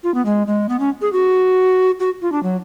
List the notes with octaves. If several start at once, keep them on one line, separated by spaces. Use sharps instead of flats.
F4
B3
G#3
G#3
B3
C#4
G#4
F#4
F#4
F4
D4
F#3